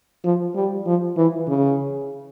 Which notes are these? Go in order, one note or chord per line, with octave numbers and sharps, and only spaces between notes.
F3
G3
F3
E3
C#3